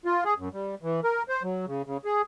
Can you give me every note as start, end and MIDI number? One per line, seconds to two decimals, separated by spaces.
0.05 0.24 65
0.25 0.34 68
0.38 0.49 42
0.53 0.75 55
0.83 1.00 52
1.04 1.23 70
1.29 1.43 72
1.43 1.65 54
1.67 1.82 49
1.86 1.97 49
2.05 2.22 68